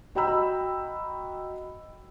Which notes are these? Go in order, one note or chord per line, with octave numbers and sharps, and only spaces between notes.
F#4 D#5 G5 A#5 B5 E6